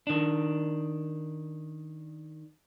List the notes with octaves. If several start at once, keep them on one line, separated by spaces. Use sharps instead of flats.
D#3 D4